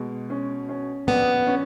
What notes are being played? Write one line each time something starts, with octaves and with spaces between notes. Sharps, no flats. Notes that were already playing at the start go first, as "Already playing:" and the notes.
Already playing: B2 G#3
C#4
C#4
A#1 B3
C#4